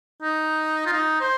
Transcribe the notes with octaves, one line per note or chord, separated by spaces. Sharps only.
D#4
F4
D#4
C5